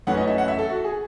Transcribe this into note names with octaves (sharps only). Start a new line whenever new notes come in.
F#2 E3 A3 C#4 F#5
D#5
E5
F#5
E5
A4
F#4
G#4